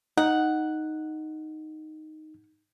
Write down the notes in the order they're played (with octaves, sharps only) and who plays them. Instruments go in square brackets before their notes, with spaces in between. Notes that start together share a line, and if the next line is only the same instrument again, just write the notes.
[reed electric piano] D#4 [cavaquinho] F#5